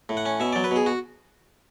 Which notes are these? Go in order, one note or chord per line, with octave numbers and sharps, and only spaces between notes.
A2
F#5
C#4
B2 E5
F#3 D5
B4
B2 G#4
F#4